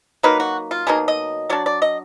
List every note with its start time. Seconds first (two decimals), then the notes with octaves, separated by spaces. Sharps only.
0.23 F#3 A#3 D#4 B4
0.40 F#4
0.71 F4
0.87 B2 F#3 A#3 D#4 G#4
1.08 D#5
1.50 F#3 D4 D5
1.66 D5
1.82 D#5